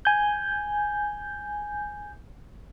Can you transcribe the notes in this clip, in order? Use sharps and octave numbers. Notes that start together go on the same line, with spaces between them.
G#5 G6